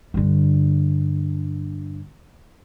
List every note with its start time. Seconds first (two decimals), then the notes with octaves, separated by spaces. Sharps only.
0.14 G2 D3